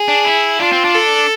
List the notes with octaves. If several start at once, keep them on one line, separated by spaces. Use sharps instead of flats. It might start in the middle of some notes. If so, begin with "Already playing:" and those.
Already playing: G#4
D4
E4
D4 F4
C4
D4
A4